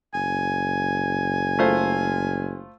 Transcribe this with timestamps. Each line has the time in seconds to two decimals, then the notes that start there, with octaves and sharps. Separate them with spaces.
0.14 F#1 G#5
1.59 A3 F4 C5